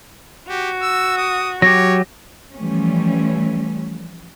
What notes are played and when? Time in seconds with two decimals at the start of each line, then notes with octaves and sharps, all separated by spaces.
0.50 F#4 G4
0.83 E6
1.18 D#6
1.62 F#3 G4 C#5 A#6
2.54 E3 F3 G3 A3 C#4